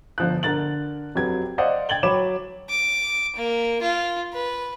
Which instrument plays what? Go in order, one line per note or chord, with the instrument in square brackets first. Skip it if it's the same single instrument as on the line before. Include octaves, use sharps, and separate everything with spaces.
[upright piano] G1 F3 F#6
D3 A#4 A6 F#7
F2 F#3 G4 B4 G#6
C5 D5 D#5 F5 F#5
G5 G#6 A6 F#7 G7
F#3 C#5 B5 D6 E7
[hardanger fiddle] D6
A#3
F4
B4